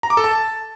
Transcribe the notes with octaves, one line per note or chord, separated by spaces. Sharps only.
A#5
D6
A4
A5